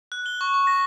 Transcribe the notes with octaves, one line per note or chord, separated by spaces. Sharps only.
F#6
G7
C#6
C#6
A#6